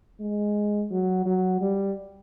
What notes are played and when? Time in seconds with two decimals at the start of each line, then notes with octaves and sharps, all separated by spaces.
0.21 G#3
0.91 F#3
1.26 F#3
1.61 G3